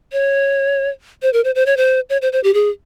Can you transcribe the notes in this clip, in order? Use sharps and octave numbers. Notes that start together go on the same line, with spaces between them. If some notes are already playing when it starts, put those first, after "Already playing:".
C#5
C5
A#4
C5
C5
C#5
C5
C#5
C5
C5
G4
G#4